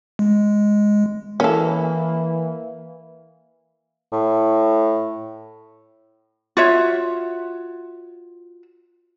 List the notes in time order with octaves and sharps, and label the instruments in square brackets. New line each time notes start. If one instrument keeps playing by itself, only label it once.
[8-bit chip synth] G#3
[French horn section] E3 [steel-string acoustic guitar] A#3 [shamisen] C#4 A4
[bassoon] A2
[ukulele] F4 F#4 C#5 E5